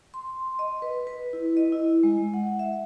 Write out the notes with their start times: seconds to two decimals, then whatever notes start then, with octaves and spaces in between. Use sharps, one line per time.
0.14 C6
0.59 D#5
0.82 B4
1.07 B4
1.33 E4
1.57 D#5
1.72 E4
2.03 G#3
2.34 F#5
2.59 E5